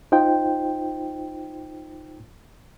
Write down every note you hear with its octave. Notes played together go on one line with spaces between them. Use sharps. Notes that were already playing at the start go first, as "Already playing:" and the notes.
D#4 F4 C5 G5